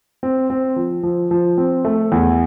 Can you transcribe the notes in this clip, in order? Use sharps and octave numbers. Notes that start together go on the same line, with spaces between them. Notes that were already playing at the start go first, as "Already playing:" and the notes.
C4
C4
F3
F3
F3
C4
A3
E2